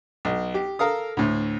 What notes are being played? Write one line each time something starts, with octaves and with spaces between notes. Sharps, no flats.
B1
G4
A4 A#4 F5 D#6
D2 A2